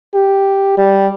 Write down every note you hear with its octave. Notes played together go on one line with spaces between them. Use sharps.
G4
G3